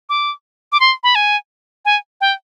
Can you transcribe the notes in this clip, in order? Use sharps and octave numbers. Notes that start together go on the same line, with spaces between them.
D6
D6
C6
B5
G#5
G#5
G5